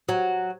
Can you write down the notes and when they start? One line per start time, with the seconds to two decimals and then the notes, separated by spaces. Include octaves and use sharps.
0.09 F#3